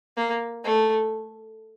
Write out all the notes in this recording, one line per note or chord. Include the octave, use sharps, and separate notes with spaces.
A#3
A3